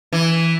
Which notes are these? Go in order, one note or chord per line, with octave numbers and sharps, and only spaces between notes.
E3